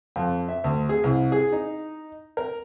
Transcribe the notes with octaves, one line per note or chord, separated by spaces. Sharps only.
F2
E5
D2
G#4
C2
G#4
D#4
A#4